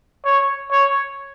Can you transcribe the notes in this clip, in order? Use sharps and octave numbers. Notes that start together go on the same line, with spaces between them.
C#5
C#5